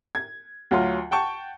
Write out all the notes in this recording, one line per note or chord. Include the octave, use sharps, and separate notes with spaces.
G#6
D2 F#3 F4 C6
F#5 G5 A5 C#6